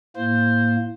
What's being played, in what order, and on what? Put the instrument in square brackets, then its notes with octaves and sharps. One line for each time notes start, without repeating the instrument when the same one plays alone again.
[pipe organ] A2 A#3 [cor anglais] C5